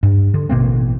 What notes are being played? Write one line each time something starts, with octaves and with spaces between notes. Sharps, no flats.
G2
D3
A1 B2 A#3 C4